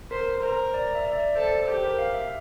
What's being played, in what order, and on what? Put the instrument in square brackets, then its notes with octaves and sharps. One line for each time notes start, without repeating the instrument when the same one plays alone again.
[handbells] A#4 [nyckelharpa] C5
[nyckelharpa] A#4 [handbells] C5
[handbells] D5
E5
D5
E5
D5
[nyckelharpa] A4 [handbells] C5
[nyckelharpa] G4 [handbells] C5
[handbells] A#4
F5
E5